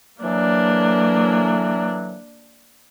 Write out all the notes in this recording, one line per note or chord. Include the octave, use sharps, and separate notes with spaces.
D3 E3 F#3 A#3 D4